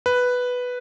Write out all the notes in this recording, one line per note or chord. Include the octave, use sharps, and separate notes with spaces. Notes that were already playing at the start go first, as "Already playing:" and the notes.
B4